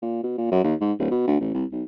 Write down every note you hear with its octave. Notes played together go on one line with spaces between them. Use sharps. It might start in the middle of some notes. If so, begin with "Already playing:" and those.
A#2
B2
A#2
F#2
D#2
G#2
D1
B2
D2
A1
C2
B1